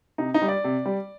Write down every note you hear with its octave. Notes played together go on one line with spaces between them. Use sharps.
C3 D#4
D#4
G3
D5
C3
G3